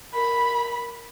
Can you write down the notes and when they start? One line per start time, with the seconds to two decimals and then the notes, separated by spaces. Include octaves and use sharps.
0.15 A#4 B5